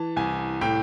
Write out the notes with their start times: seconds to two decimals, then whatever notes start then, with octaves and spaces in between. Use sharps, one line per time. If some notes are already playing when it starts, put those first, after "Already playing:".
Already playing: E3 A5
0.16 C2 G#5
0.61 A2 G5